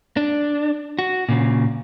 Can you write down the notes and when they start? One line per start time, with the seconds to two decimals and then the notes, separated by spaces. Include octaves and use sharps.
0.17 D4
0.99 F#4
1.29 A#2 C#3